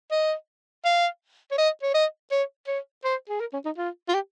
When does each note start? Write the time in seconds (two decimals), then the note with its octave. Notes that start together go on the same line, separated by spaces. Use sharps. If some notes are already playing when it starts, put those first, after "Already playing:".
0.11 D#5
0.85 F5
1.51 C#5
1.58 D#5
1.83 C#5
1.94 D#5
2.31 C#5
2.67 C#5
3.04 C5
3.29 G#4
3.40 A#4
3.53 C#4
3.65 D#4
3.78 F4
4.09 F4
4.14 G4